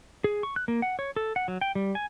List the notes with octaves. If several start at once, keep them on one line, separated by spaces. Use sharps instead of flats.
G#4
C#6
F#6
A#3
F#5
C#5
A4
F#5
F#3
G5
G3
G#5